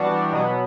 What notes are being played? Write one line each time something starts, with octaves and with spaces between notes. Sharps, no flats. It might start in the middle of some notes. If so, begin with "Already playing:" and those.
Already playing: E3 G3 B3 D4 F#4
B2 F#3 B3